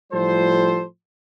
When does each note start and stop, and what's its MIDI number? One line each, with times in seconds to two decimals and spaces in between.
0.13 0.84 45
0.13 0.84 53
0.13 0.84 55
0.13 0.84 65
0.13 0.84 69
0.13 0.84 72